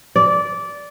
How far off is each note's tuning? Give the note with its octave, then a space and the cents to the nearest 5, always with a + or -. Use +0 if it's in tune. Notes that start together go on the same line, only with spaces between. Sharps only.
D5 -15